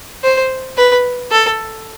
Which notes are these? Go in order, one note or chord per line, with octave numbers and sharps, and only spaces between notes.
C5
B4
A4